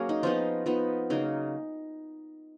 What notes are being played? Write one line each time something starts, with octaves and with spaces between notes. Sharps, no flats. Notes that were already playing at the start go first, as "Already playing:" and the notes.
Already playing: F#3 A#3 C#4 G#4
D#4
F3 B3 D#4 F4
F3 B3 D#4
C#3 F#3 A#3 D#4